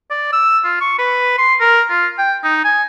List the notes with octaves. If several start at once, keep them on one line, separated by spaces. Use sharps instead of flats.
D5
E6
F4
C#6
B4
C6
A#4
F4
G5
D#4
G#5